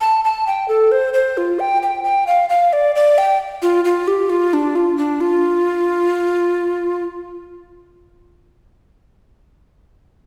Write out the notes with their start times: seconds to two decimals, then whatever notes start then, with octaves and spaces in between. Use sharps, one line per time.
0.01 A5
0.24 A5
0.47 G5
0.68 A4
0.92 C5
1.14 C5
1.37 F4
1.59 G5
1.83 G5
2.04 G5
2.27 F5
2.49 F5
2.73 D5
2.95 D5
3.18 G5
3.62 F4
3.85 F4
4.08 G4
4.30 F4
4.53 D4
4.75 F4
4.97 D4
5.21 F4